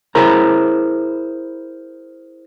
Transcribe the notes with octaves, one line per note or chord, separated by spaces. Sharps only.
E4 G#4 A#4 C5 A#5